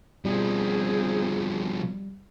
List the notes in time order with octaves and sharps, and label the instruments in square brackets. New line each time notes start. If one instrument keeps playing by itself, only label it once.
[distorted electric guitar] B2 F3 [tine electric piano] G3 [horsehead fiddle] C4 G#4